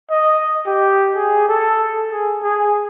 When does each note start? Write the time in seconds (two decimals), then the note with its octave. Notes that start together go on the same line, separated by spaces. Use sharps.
0.11 D#5
0.66 G4
1.16 G#4
1.49 A4
2.12 G#4
2.43 G#4